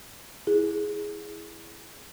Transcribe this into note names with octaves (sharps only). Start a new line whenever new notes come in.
E4 G#4